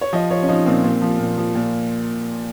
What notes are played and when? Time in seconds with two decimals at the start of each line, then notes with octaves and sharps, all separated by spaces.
0.01 C#5
0.13 F3 D#5
0.30 F3 C#5
0.43 C#4
0.49 F3 D#4
0.66 A#2 C4
0.84 A#2 C4
1.02 F3
1.20 A#2
1.38 F3
1.55 A#2